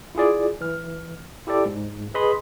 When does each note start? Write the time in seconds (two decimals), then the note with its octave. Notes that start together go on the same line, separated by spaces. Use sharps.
0.15 E4 F4 G#4 D5
0.61 E3 F6
1.47 E4 G4 A4 D5
1.66 G#2
2.14 G#4 B4 D#5 B5 C6 D#6